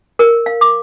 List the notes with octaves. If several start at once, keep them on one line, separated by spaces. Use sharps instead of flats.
A#4
F5
D6